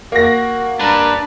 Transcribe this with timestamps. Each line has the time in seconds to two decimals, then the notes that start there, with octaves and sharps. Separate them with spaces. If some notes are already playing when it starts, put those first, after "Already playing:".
0.12 A#3 F#4 A#6
0.79 D4 B4 A#5